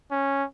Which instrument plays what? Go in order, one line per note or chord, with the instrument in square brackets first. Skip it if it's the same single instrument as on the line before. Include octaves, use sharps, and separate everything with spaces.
[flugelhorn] C#4